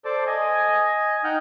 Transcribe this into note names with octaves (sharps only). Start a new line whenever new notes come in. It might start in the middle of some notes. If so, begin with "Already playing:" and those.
A4 C5 D5 A5 D6
D#5 G#5
D#4 F#5 G5 F6 G6